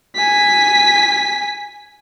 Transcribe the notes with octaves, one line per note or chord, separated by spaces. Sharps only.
G#5 B6